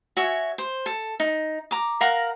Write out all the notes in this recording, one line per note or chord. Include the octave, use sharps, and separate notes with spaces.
F#4 C#5 E5 G#5
C5
A4
D#4
A#5 D6
A#4 F5 F#5 A#5